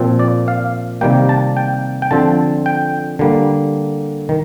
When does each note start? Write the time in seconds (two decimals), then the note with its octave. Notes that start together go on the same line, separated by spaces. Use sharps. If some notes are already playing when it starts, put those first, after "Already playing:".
Already playing: A#2 F3 C4
0.19 D5
0.48 F5
1.01 C3 D#3 G3 A#3 G5
1.29 A5
1.57 G5
2.02 G5
2.11 D3 F3 C4 A5
2.66 G5
3.19 D3 G3 A#3
4.29 D#3